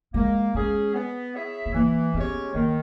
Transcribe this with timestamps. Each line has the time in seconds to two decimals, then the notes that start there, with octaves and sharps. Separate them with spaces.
0.14 G#3 A#3
0.55 G#3 C#4 G#4
0.94 B3
1.35 E4 G#4 C#5 E5
1.66 B3
1.74 E3 A#3
2.14 G#3 B3 C#4 G4 C#5
2.54 D#3 A#3